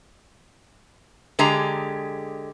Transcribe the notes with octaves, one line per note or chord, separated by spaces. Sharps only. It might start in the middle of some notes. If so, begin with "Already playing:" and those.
D3 G#3 G4 G#4 A#5